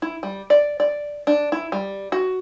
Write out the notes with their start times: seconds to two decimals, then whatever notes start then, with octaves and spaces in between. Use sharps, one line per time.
0.02 E4
0.23 G3
0.50 D5
0.80 D5
1.27 D4
1.52 E4
1.72 G3
2.12 F#4